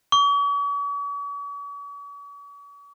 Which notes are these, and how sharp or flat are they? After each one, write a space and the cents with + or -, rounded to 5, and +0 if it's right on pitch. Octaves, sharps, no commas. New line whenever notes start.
C#6 +45